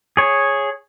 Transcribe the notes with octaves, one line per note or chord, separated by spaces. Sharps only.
G#4 C#5